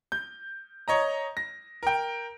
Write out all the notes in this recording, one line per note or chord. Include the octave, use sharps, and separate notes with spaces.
G6
C#5 D#5 A#5
A#6
A#4 G5